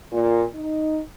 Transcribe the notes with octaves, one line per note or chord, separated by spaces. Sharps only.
A#2
D#4